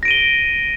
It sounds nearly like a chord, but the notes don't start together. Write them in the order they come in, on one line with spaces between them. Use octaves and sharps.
A#6 D7 D#7 G7